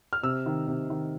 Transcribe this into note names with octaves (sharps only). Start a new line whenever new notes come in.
F6
C3 E6
D#3
C3
D#3